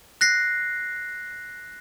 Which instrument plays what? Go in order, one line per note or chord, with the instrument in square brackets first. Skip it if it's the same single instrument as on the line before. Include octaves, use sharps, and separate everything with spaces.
[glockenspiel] F#6 A#6 C7